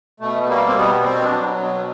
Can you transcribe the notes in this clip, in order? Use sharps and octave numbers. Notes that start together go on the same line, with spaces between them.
B2 A3
A3
G3 A#3
C4
B2 B3
B2 C4
D4
F#3
B2